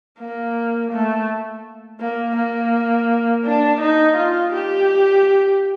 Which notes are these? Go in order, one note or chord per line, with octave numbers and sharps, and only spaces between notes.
A#3
A3
A#3
A#3
D4
D#4
F4
G4